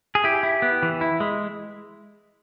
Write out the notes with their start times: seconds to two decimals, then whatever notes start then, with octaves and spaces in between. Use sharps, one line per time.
0.15 G#4
0.24 E4 G4
0.43 E4
0.62 B3
0.83 E3
1.01 E4
1.20 G#3